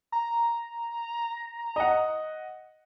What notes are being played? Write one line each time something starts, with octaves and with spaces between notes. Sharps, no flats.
A#5
D#5 F#5